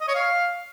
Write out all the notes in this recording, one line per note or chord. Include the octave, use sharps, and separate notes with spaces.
D#5
C#5
F5